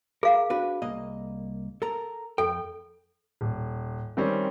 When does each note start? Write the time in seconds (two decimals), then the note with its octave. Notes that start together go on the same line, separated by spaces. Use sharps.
0.23 G#4 A#4 F5
0.50 D4 F#4 B4
0.82 C2 A#3 D#5
1.82 A4 A#4 A#5
2.38 F2 A4 G5
3.41 D#1
4.17 D#3 G3 C4 C#4